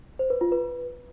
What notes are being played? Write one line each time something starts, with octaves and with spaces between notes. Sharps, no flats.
C5
B4
F4
B4